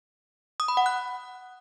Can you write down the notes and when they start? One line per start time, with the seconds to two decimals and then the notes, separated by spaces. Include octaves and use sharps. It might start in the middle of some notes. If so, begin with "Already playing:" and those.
0.60 D#6
0.68 B5
0.77 F#5
0.86 F#6